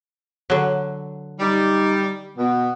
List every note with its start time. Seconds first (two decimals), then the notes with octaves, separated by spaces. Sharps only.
0.50 D3 F#3
1.40 G3 D#4
2.37 B2 B3